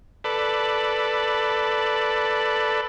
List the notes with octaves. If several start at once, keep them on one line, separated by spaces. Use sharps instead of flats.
A4 B4 D5